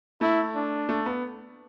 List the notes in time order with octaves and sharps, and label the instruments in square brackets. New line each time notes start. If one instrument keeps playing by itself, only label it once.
[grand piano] A3 [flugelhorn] E4
[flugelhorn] D4
[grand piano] A3
B3